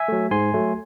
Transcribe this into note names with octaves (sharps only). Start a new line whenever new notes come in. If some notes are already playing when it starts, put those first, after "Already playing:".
Already playing: E5 G#5
F#3 A3
G#2 G#5 C6
F#3 A3